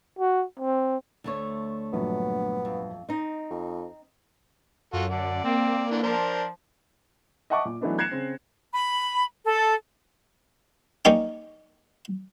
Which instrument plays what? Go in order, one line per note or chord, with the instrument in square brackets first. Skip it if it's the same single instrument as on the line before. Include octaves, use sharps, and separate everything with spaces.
[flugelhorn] F#4
C4
[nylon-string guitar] D2 A3 C#5
[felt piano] A#1 G2 F#3 [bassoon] B3
[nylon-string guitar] F2
[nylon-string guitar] C4 D#4 [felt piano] D#5
[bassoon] F2
[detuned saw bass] F#2 [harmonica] F4 F#4 A4
[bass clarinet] D3 [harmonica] D5
[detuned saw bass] A#3 [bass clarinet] C4
[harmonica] D3 E3 D4
[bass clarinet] F3 [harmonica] D4 A#4 C5
[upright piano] D#5 E5 F#5 A5 C#6 D6
A#2 D6
E3 F#3 A3 B3 D4 D#4
F#6 G#6 A#6 C7 C#7 E7
C#3 C4
[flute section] B5
A4
[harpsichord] G3 A#3 C#4 D#4 G4